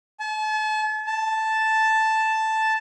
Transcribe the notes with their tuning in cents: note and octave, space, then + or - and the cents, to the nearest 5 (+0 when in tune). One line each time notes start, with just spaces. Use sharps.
A5 -40
A5 +0